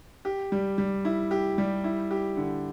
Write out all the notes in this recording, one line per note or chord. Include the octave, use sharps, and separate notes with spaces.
G4
G3
G3
E4
G4
G3
E4
G4
D3